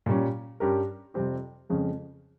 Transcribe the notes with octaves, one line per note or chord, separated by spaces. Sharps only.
A#2 G3 C#4
G2 G3 C#4 G4 A#4
F2 C3 G3 C4 G4
F2 C#3 F3 G#3